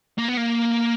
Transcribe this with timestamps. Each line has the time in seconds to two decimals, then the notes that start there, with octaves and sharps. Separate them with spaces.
0.18 A#3
0.28 B3
0.37 A#3